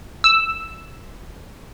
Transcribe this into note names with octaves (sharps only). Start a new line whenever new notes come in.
E6